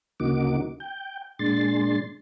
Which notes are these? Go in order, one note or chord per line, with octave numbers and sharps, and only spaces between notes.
D2 C#3 A#3 D#4 F#4 D6
G5
A#2 G#3 D4 C6 A6